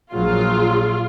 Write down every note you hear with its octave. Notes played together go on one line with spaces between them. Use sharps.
A#1 F#3 F4 G#4